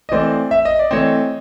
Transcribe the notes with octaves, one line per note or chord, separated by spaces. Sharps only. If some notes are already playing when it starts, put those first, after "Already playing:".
D#5
E3 A3 C4 C5 D5
E5
D#5
D5
E3 A3 C4 C#5 D#5